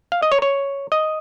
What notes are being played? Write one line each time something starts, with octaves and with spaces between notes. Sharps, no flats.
F5
D#5
C#5
C#5
D#5